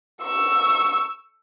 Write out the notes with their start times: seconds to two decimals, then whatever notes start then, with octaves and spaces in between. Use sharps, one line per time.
0.23 C#6 E6